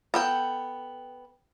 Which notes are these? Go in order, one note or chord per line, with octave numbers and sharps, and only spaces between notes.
B3 A4 G5